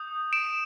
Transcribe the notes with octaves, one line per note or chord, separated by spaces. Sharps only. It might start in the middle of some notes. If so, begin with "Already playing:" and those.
Already playing: D#6 G6
D7 E7